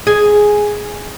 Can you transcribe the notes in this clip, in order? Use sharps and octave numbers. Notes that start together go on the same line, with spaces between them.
G#4